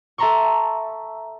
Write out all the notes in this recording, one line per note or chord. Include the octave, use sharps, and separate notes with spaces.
A4 E5 A5 A#5 C6 C#6